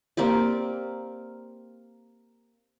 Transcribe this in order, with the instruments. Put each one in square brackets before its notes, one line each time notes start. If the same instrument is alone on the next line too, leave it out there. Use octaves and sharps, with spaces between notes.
[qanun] A#3 C4 G4 D5